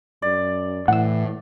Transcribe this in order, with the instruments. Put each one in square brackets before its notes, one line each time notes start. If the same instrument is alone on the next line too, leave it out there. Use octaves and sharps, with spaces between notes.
[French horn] F#2 [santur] D5
[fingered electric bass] A2 [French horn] E3 [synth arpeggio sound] F#5 E6